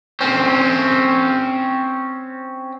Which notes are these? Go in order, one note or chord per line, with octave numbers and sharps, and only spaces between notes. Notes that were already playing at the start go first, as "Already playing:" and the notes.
C4 C#4